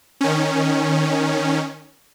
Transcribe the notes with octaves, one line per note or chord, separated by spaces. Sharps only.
D#3 C#4